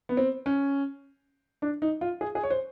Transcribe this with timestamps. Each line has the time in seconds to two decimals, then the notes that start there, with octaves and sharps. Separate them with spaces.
0.09 B3
0.17 C4
0.46 C#4
1.62 D4
1.82 D#4
2.01 F4
2.21 G#4
2.35 G#4
2.43 C#5
2.50 C5